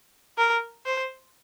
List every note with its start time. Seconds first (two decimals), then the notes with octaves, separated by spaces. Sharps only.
0.38 A#4
0.85 C5